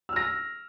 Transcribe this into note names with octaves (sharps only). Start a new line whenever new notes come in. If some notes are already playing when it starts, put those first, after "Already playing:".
E6 F6 A#6